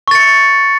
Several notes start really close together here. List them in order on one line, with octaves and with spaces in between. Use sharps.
C#6 A6 C#7